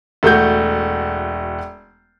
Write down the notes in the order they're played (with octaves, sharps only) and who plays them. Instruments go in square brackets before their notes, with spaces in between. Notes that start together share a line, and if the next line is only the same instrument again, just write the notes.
[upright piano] E1 A3 F#4 G6